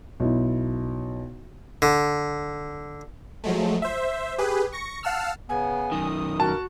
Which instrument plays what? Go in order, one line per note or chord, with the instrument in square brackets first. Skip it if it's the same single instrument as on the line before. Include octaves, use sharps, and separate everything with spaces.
[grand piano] B1 E4
[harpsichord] D3
[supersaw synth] F3 F#3 G#3 A3
C5 E5
G4 G#4 B4
C#6 A#6 C#7
F5 F#5 A5 E6 F6
[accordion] C#3 B3 [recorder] G#5
[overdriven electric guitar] F#2 D#3 [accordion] D#6
[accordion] G2 A#4 [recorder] F#4 [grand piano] A5